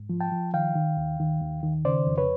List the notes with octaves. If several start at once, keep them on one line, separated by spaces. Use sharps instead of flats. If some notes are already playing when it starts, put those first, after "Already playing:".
Already playing: G#2
F3
G5 A5
F3
D#3 F5 G5
D#3
D#2
D#3
D#2
D#3
C#3 C5 D5
F2
B4 C#5